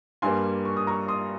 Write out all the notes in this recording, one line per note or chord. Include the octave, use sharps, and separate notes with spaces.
G2 G3 A#3 G#5 C6
C#6
D#6
A#5 C#6
C6 D#6